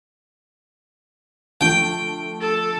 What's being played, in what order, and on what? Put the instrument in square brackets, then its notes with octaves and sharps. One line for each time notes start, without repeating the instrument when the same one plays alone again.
[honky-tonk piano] D3 F3 A3 [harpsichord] G5
[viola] A4